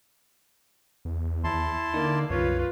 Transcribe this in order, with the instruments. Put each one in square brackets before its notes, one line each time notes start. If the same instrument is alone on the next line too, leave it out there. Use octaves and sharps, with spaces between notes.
[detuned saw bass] E2
[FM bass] D#2 [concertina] E4 A5 C6
[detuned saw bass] D3 [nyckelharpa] A#3 D5 [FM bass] D#4
[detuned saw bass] C2 [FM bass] F#2 [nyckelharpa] F4 B4 [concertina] C#5